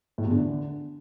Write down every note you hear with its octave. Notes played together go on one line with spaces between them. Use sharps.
A2
E2
D3